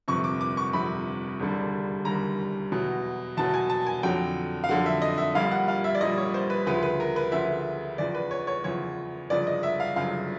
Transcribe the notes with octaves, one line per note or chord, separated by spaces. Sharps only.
G1 F2 C3 C#6
D6
D6
C#6
G1 F2 C3 B5
E1 D#2 D3 G3
E1 D#2 D3 G3 A#5
E2 B2 F#3
E2 B2 F#3 A5
G#5
A5
G#5
F2 D3 F#3 G5
F5
F2 D3 F#3 F#5
E5
D#5
E5
A#1 A#2 G3 F5
F#5
F5
E5
D5
A#1 A#2 G3 D#5
C#5
C5
B4
D2 C#3 F3 B4
B4
A#4
B4
D2 C#3 F3 E5
E2 C#3 F3 D5
B4
C#5
C#5
E2 C#3 F3 C#5
G1 F#2 C#3 F3 D5
D#5
E5
F5
G1 F#2 C#3 F3 F5